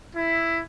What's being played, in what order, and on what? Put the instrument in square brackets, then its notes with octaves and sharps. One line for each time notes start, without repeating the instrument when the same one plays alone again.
[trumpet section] E4